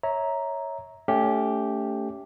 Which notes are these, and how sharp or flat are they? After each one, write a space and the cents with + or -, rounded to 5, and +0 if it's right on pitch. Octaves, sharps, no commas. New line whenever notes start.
C#5 +0 E5 -25 A#5 +0
A3 +0 C#4 +25 G4 +0